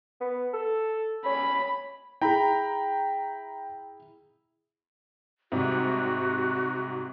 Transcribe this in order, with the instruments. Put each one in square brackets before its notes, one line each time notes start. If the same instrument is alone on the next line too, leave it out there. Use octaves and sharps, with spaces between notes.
[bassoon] B3
A4
[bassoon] C#4 [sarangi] B5
[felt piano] E4 G#4 [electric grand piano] G5 A#5 B5
[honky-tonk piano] G#2 C3 G3 [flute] F#4